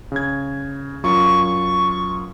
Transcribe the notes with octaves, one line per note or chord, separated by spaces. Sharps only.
C#3 G#6
F#2 F4 C#6